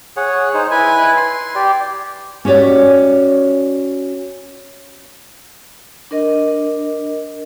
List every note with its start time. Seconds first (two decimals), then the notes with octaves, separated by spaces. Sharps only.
0.17 G#4 C#5 F#5
0.54 D#4 G#4 C5
0.71 E4 B4 G#5
1.17 C6
1.55 G4 D5
2.45 C#4 F#4 G4 C#5 D5
6.11 D4 A#4 D#5